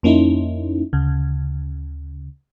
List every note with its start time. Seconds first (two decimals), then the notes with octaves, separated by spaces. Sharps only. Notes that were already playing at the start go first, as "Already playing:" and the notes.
0.03 F2 A#3 C#4 D#4 E4
0.93 D2 C#3